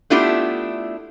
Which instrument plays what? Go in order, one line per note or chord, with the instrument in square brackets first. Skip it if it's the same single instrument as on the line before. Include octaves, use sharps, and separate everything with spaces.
[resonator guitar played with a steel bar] A3 B3 D4 E4 F4 G4